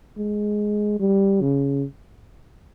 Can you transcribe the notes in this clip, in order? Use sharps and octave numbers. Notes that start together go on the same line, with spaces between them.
G#3
G3
C#3